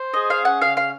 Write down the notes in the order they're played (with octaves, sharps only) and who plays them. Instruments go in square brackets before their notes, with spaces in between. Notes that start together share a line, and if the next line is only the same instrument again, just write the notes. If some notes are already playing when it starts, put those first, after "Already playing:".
Already playing: [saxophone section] C5
[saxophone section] G#4 [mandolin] D#5
[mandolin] F5
[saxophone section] C#4
[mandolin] F#5
[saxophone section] C#3 [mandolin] F5
[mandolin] F5